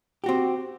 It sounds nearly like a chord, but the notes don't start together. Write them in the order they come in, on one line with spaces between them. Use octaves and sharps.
G4 F#4 C4